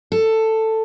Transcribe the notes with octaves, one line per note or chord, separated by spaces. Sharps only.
A4